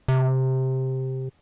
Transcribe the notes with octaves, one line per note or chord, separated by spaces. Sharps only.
C3